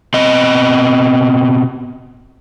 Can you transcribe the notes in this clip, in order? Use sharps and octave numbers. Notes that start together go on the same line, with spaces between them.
B2 C4 D#5